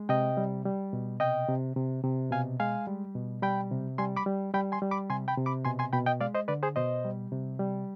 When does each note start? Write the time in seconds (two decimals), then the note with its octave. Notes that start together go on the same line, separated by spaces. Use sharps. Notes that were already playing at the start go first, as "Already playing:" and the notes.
Already playing: G#3
0.09 C3 D#5 G5
0.37 G3
0.65 G3
0.93 B2
1.20 C3 D#5 G5
1.48 C3
1.76 C3
2.04 C3
2.31 B2 F5 G#5
2.60 G#3 F5 G#5
2.87 G3
3.15 B2
3.42 G3 G5 B5
3.71 C3
3.98 G3 G#5 C6
4.17 B5 D6
4.26 G3
4.54 G3 G5 B5
4.72 G#5 C6
4.82 G3
4.91 B5 D6
5.10 C3 G#5 C6
5.28 G5 B5
5.38 C3
5.46 B5 D6
5.65 B2 G#5 C6
5.79 G#5 C6
5.93 B2 G5 B5
6.06 D#5 G5
6.21 G#3 D5 F5
6.35 C5 D#5
6.48 D3 B4 D5
6.63 G#4 C5
6.76 B2 C5 D#5
7.04 G3
7.32 C3
7.59 G3